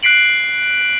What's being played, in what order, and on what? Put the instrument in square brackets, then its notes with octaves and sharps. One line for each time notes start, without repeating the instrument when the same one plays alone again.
[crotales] F#6 B6 C7 D7 F#7